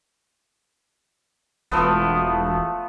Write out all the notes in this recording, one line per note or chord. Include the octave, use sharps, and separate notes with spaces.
E1 F3 A3 B3